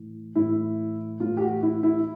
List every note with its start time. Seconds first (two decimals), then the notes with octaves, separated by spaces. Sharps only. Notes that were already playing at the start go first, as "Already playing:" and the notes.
Already playing: A2 E3
0.35 A2 E3 E4
1.20 A2 E3 F4
1.37 G4
1.41 F#4
1.63 E4
1.83 E4